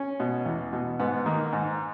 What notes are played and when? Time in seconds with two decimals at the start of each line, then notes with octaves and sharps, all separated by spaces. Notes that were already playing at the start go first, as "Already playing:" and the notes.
Already playing: C#4
0.20 B2
0.46 E2
0.73 B2
1.00 G#2 B3
1.26 D#3 A#3
1.53 G#2